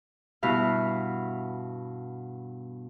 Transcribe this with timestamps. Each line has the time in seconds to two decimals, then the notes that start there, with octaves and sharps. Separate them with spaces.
0.43 G2 B2 E4 F5 F#6